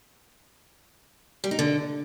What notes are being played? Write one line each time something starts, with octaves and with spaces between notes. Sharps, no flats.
G3
D#4
D3